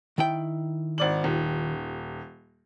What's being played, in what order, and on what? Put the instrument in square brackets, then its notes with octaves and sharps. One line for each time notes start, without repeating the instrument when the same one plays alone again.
[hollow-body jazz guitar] D#3 E4 G5
[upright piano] G#1 D5 F#7
D#1